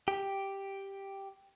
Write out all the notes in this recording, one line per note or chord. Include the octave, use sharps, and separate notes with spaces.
G4